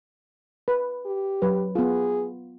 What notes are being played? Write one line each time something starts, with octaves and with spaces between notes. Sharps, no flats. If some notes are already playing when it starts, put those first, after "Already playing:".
B4
G4
F#3 B4
B3 F4 G#4